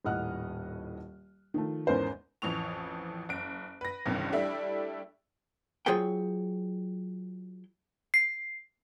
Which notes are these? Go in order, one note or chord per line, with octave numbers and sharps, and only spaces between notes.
D#1 A2 D#5 F#5 F6 F#6
D#3 F3 A3
E2 G#2 C#4 A#4 C5
A1 F2 E3 C#6 F7
F#1 D7
B4 A#6
G1 C#2 G2 C3 D#3 E3
G3 A3 D4 E4 E5
F#3 F4 G#4 C5 C#5 G5
C7